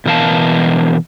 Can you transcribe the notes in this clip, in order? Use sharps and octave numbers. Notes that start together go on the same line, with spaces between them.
B2 E3 A#4 F5 A5